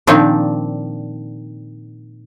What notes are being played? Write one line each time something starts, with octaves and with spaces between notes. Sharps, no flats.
A#2 D#3 F3 C4 D4